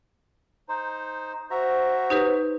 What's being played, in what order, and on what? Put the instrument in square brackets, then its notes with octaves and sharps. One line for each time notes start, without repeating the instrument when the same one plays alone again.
[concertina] D#4 C5
[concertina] F#4 E5 A#5 [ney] C5
[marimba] D#4 G4 B4